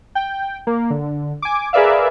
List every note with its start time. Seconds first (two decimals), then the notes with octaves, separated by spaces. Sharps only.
0.15 G5
0.67 A#3
0.90 D3
1.42 G#5 D6
1.73 G#4 A#4 B4 D5 E5 F5